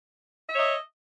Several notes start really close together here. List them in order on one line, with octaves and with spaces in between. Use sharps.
E5 C#5 D#5